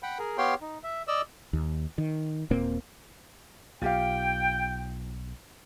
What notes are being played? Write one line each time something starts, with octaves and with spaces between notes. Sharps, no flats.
F#5 G5 B5
G#4 A#4
B3 G4 C#5 F5 G5 C6
D#4
E5
D5 D#5 E6
D#2
D#3
D#1 A#2 A#3 C4
B1 F4 G4 F5 G5